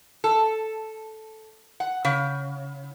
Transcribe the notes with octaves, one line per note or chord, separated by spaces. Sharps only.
A4
F#5
C#3